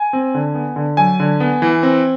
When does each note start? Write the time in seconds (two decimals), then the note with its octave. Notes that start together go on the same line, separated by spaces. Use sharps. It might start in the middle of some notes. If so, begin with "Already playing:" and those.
Already playing: G#5
0.13 C4
0.35 D3
0.55 B3
0.76 D3
0.97 F#3 G#5
1.20 D3
1.40 B3
1.62 E3
1.83 C4